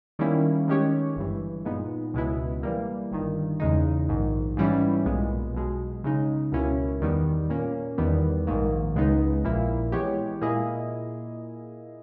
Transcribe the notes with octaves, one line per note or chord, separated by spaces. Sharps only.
D#3 G3 A#3 C#4 E4
D#3 G#3 C#4 G4 C#5
G1 G2 E3
A#2 G#3 B3 D#4
C#2 B2 G#3 B3 E4
E3 G3 A#3
G1 G2 D#3
E2 C#3 G#3 D#4
A#1 G#2 D#3
G#2 E3 G3 C#4 E4
B1 A#2 G#3 B3
B1 B2 G#3
C#3 G#3 D#4
C#2 B2 A#3 C#4 E4
E2 D#3 G3 B3
A#2 A#3 C#4
E2 D#3 G3 B3
A#1 G#2 D#3 A#3
C#2 C#3 G#3 B3 D#4
A#1 A#2 A#3 E4
E3 G#3 B3 G4 C#5
A#2 A#3 E4 G#4 D#5